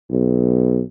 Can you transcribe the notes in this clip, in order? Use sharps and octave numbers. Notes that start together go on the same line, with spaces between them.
B1